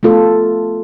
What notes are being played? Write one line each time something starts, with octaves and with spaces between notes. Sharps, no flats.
A3 B3 F4 A4